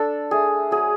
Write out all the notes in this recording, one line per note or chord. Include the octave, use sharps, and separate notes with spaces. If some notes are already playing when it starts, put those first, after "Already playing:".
Already playing: D4 A4
A3 G#4
F#3 G#4